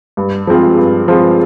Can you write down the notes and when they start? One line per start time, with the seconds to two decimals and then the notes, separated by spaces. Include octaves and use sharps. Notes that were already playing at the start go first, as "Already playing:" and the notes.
0.17 G2
0.47 F3 G#3 C4 F4
0.78 G2
1.08 F3 G#3 C4 F4